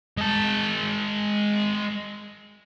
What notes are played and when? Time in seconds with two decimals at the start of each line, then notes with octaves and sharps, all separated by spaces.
0.17 G#3 A5